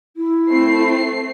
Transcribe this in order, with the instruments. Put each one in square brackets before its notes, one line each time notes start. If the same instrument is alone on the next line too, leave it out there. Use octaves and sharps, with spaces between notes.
[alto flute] E4
[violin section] A3 C4 C7